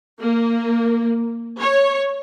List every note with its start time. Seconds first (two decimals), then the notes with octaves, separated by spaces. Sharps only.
0.21 A#3
1.61 C#5